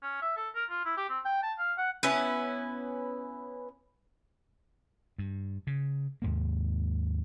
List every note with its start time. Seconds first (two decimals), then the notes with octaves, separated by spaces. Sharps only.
0.02 C#4
0.22 E5
0.37 A4
0.55 A#4
0.69 F4
0.85 E4
0.97 G4
1.09 C4
1.25 G5
1.43 A5
1.58 F5
1.78 F#5
2.03 B3 C#4 E4 B4
5.18 G2
5.67 C#3
6.22 D#2 G#2 A#3